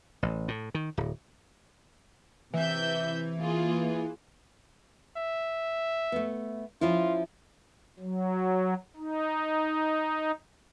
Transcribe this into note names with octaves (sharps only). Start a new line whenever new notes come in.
A1
A2
D#3
D1
C3 E3 E5 G6
A#3 F4 G#4
E5
A3 B3
F3 C#4 E4 F4
F#3
D#4